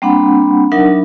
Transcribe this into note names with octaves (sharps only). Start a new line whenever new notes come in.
G3 A#3 C4 D4 F#5 B5
F#3 D4 D#4 A#4 E5 F#5